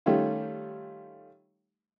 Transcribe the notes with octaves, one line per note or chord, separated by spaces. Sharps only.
D#3 G3 A3 C#4 F4